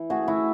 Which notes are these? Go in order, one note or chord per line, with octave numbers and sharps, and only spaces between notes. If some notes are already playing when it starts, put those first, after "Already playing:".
Already playing: E3
A3 F#4 G#4
E4 F#4